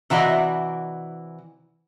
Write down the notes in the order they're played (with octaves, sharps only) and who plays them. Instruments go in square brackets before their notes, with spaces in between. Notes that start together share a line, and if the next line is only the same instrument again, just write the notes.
[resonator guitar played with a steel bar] C3 E3 F#4 D5 D#5